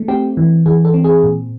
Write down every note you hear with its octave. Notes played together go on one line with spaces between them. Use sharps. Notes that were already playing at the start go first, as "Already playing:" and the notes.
Already playing: A3
C4 G4
E3
E3 G#4
A4
C4
G#4
A#2